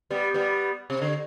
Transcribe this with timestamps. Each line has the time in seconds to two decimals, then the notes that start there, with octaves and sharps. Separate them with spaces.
0.10 G3 B3
0.34 G3 B3
0.90 C3
1.02 D3